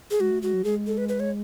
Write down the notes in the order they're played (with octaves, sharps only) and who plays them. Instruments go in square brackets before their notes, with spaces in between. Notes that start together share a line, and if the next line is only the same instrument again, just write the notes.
[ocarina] G#4
[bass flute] G#3 [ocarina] F#4
[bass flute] A3
[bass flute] G#3 [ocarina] F#4
[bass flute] F#3
[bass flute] G#3 [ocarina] G#4
[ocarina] A4
B4
B4
C#5